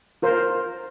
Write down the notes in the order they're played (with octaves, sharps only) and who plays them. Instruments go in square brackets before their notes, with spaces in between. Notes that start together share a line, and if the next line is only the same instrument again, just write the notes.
[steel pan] F4 A#4 C5